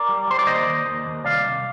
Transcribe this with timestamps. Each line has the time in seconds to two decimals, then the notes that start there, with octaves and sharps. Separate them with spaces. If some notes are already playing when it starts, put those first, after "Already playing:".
Already playing: A#4 D5
0.09 G3
0.27 G3 C5
0.39 D5
0.47 D#2 C5 D#5
0.67 D#2
0.86 D#2
1.06 D#2
1.25 C2 D5 F5
1.45 C2